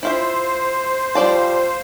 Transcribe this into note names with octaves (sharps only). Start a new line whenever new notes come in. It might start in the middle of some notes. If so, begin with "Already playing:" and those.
E4 F4 C5 E5
F3 G3 D5 A5